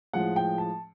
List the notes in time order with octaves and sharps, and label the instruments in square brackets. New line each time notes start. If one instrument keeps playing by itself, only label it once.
[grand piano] A2 F3 G#3 F#5
G5
A5